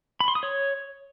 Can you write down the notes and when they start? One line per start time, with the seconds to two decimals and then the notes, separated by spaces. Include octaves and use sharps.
0.20 B5
0.28 C6
0.35 D#6
0.43 C#5